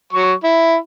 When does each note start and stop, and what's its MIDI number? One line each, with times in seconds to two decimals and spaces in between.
0.13 0.33 54
0.13 0.33 85
0.43 0.76 64